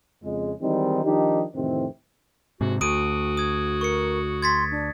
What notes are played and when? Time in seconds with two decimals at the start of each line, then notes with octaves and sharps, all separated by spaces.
0.23 F2 C#3 G#3
0.61 D#3 E3 G3 G#3 C4 D#4
1.04 D#3 F3 G3 D4 D#4 G4
1.55 F2 A2 C3 D#3 E3 C4
2.61 G#2 C3 F#4
2.81 D2 F#4 D#6 D7 D#7
3.37 D#6 G#6
3.81 A#4 C#6 C#7
4.42 C6 G#6 A6 B6
4.71 D4